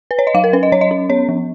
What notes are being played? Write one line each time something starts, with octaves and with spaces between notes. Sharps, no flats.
B4
C#5
D#5
F#3 F5
A#4
C#4 B4
D#5
F#3 C#5
D#5
C#4
B3 C#5
F3